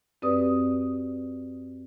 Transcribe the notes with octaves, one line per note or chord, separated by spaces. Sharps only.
F#2 C4 G4 B4 D5 D#6